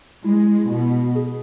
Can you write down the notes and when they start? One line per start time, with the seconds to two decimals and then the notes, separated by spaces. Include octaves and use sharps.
0.24 G#3 E4
0.69 B2
1.15 G#4